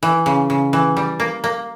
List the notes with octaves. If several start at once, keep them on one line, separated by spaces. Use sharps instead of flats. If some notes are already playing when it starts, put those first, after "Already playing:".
E3
C#3
C#3
E3
G3
A#3
A#3